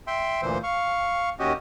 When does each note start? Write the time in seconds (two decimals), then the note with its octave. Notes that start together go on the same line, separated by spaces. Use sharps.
0.07 E5 G5 C6
0.42 D2 A#2 E3 C5
0.63 F5 C#6
1.39 D#2 C#4 F#4 G4 D#5